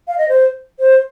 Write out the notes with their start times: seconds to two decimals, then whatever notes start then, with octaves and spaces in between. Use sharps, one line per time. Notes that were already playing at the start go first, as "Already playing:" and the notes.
0.08 F5
0.18 D#5
0.29 C5
0.79 C5